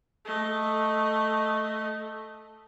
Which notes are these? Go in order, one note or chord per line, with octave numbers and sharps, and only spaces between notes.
A3 D#5